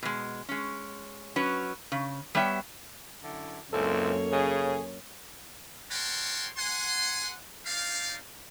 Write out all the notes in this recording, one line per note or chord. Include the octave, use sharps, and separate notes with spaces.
B2 G#3
G#3 C#4
F#3 C#4 B4
C#3
G3 B3 C#5 E5 G5
F#2 D3 E4
C#2 F#2 A#3 C4 C#4 E4 A4 C#5
C#3 C#4 G#4
A#4 C#5 F#5 G5 A5 C6
F#5 G#5 C6
C4 D#4 D5 F5